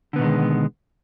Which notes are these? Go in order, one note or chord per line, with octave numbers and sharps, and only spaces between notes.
B2 D3 D#3 G#3 B3